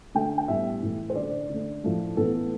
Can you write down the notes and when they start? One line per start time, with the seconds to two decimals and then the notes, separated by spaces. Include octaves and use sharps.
0.15 D3 A3 G5
0.38 G5
0.48 A2 G3 B3 E5
0.83 A2 E3 A3
1.10 C5
1.15 D3 D5
1.21 A3
1.50 D3 A3
1.84 A2 F3 A3
2.17 A2 E3 B3 A4